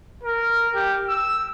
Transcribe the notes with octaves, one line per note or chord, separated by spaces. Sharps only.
A#4
G4
E6